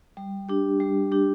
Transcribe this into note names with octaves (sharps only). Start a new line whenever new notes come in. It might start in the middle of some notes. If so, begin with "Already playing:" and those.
G3
D4 G4
G3
D4 G4